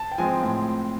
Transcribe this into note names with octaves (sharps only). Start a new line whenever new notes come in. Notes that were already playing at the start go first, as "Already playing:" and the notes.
Already playing: A5
G5
F3 G#3 C4 G#5
A2